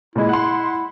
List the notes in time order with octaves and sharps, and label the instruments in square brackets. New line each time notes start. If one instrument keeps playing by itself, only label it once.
[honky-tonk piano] A#2 G#3 [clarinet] E4
[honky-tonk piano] F#5 C6